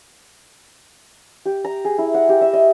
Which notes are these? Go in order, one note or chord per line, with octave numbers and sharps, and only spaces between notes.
G4
A#5
G#4
E4
F#5
G4
E5
D#5